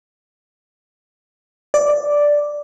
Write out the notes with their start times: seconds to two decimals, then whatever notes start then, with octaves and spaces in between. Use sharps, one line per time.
1.74 D5